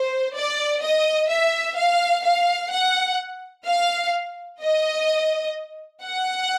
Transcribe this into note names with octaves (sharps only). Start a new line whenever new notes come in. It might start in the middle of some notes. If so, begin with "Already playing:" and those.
Already playing: C5
D5
D#5
E5
F5
F5
F#5
F5
D#5
F#5